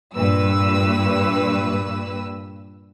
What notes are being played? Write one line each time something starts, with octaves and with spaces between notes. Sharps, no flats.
G2 A#2 B4 E6